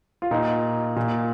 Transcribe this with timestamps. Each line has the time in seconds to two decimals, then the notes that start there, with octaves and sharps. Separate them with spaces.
0.22 F4
0.31 A#2 D#4
0.96 A#2